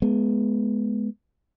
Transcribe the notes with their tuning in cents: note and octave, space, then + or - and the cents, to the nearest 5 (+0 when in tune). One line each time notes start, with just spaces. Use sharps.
G#3 +20 B3 +0